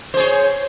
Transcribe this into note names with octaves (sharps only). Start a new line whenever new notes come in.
G#4 C5 C#5